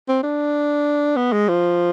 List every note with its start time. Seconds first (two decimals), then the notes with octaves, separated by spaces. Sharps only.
0.08 C4
0.23 D4
1.16 B3
1.32 G#3
1.48 F3